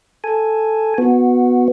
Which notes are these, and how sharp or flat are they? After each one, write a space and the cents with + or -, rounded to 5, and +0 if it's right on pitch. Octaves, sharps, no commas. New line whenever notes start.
A4 +0 G#5 +0
B3 +0 F#4 -15